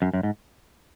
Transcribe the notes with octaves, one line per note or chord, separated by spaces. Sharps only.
F#2
F#2
G#2